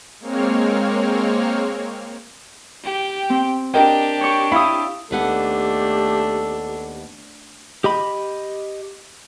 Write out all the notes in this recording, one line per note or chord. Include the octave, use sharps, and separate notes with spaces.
G#3 A#3 C4 C#5 F6
G4 G5
C4
D4 G4 A#4 D#5 G5
C#5 C#6
E4 F5 B5 D#6
D#2 A3 B3 D4 G4 A4 F#5
G4 D#5 B5